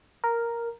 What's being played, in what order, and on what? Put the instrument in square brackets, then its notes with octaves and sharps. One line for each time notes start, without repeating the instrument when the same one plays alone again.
[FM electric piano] A#4